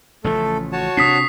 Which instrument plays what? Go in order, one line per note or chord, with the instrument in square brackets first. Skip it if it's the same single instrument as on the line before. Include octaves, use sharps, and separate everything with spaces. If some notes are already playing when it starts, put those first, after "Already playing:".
[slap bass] A1 C#3 F3 [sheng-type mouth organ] A3 A4
[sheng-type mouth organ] F#4 C#5 A5
[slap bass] C3 C4 D4 [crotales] D#6 B6 C7